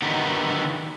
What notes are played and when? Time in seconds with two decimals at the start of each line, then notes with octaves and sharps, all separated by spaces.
0.02 D3 D#3 F#3 B3 D#4 G4